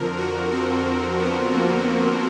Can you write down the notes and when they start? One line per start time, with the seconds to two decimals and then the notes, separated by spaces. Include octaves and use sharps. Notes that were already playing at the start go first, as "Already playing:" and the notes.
Already playing: F2 D3 F3 A#4
0.17 F#4
0.52 C4
1.19 B3
1.53 A#3